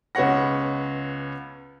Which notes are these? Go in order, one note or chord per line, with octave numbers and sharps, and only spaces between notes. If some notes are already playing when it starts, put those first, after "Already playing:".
C#2 B3 C#4 C#5 F#5 A#6